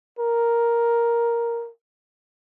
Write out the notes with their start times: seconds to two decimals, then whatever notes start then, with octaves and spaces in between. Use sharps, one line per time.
0.19 A#4